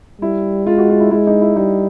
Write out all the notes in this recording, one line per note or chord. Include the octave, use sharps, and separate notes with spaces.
G3 E4
G#3 F4
F#4
F4
E4
G#3 E4
D#4
E4
G3 D#4